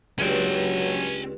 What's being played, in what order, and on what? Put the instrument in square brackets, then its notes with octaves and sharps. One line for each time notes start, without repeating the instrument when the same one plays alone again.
[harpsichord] C#2 G2 [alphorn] F#3 [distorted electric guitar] C#4 G5